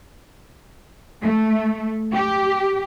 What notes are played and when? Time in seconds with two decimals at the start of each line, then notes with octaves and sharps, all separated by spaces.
1.22 A3
2.15 G4